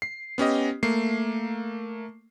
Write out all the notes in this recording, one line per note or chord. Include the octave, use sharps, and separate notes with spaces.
C7
B3 C#4 G4 D#5
A3 A#3 C7